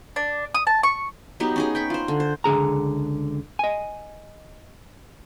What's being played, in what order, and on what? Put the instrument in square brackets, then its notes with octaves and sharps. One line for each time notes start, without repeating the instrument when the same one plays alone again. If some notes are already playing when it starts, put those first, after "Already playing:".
[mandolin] D4
D#6
A5
C#6
[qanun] F#3 B3 D#4 G4
C#4 D#4 G#4
G5 B5 C#6
F4 C5
D3
C5
[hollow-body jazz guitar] C#2 D3 G#4 A#5
D#5 G#5